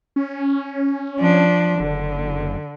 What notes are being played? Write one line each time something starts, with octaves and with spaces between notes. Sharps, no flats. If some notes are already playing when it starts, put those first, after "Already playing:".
C#4
F3 D4
F#1 D3